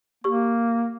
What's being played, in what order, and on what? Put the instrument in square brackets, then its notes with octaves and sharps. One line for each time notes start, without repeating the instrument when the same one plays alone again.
[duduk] A#3 [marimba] G4 C#6